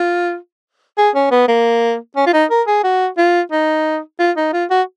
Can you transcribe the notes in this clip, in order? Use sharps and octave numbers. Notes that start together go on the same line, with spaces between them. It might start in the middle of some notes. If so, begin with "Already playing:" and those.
Already playing: F4
G#4
C#4
B3
A#3
C#4
F4
D#4
A#4
G#4
F#4
F4
D#4
F4
D#4
F4
F#4